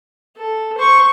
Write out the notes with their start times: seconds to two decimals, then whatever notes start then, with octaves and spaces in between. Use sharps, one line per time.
0.37 A4
0.77 C5 C#6